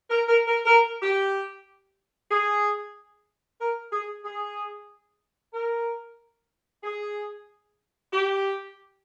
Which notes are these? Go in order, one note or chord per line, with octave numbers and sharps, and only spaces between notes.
A#4
A#4
A#4
A#4
G4
G#4
A#4
G#4
G#4
A#4
G#4
G4